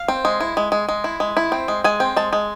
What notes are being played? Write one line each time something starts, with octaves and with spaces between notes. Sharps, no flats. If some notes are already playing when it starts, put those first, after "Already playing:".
Already playing: F5
C4
G#3
E4
G#3
G#3
G#3
E4
G#3
E4
C4
G#3
G#3 G#5
C4
G#3 A5
G#3